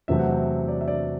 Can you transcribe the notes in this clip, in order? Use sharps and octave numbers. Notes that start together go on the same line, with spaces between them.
E2 C3 F#3 A3 C4 E5
F#5
E5
D5
E5
D5